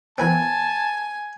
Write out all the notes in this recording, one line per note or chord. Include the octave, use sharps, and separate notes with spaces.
E3 B3 C4 G#5 A5